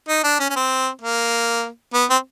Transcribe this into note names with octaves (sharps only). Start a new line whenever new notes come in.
D#4
D4
C#4
C#4
C4
A#3
B3
C4